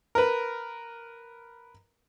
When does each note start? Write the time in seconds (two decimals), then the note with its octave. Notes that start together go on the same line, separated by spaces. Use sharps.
0.15 A#4 B4